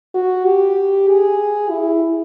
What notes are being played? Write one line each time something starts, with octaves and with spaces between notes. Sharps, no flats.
F#4
G4
G#4
E4